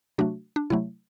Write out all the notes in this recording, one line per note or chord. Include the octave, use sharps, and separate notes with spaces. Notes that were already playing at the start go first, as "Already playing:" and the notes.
C3 F#3 A3 D4 F#4
D4
C3 F#3 A3 E4